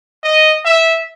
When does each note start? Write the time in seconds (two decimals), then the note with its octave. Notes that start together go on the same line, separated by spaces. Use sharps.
0.23 D#5
0.65 E5